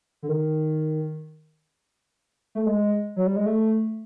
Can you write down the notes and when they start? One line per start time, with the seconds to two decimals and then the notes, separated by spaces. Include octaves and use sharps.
0.23 D3
0.29 D#3
2.55 A3
2.66 G#3
3.16 F#3
3.26 G3
3.36 G#3
3.46 A3